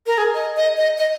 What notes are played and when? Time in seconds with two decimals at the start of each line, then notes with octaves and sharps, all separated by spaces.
0.07 A#4
0.18 G#4
0.35 D#5
0.57 D#5
0.77 D#5
0.98 D#5